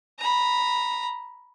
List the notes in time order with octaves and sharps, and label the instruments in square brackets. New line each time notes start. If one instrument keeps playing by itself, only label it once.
[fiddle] A#5 B5